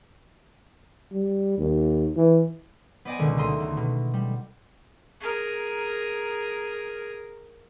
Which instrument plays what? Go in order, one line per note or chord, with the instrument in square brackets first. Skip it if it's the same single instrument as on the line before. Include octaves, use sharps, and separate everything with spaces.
[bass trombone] G3
D#2
E3
[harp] B3 C5 D5 D#5 F#5 G#5
C#2 B2 D3 D#3 G#3
D2 A3 D#4 C6 D#6
C#2
B2
G3
[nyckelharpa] G#4 A#4